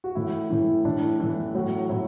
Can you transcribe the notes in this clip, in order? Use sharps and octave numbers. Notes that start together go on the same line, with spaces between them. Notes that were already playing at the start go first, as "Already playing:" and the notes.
F#4
A2 E3 E4
A2 E3
A2 E3 D4
A2 E3
A2 F#3 F#4
A2 F#3 E4